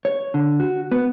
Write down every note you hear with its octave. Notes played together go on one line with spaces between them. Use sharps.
C#5
D3
F#4
B3